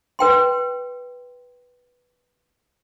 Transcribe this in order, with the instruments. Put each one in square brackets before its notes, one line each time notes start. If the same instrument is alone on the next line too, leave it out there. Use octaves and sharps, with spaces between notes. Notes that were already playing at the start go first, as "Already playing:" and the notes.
[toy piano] B4 G5 C6